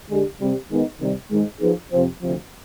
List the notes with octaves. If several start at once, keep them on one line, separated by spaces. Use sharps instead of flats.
D3 G#3 D4 G4
C3 G3 C4 G4
D#3 G#3 B3 D#4
C3 D#3 G3
G#2 D#3 G#3
F3 B3 D#4 G#4
F2 C3 F3 C4
D2 C3 F3